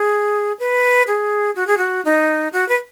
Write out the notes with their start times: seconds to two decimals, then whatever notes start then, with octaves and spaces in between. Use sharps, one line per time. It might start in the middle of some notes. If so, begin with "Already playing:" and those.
Already playing: G#4
0.59 B4
1.07 G#4
1.56 F#4
1.67 G#4
1.78 F#4
2.05 D#4
2.53 F#4
2.69 B4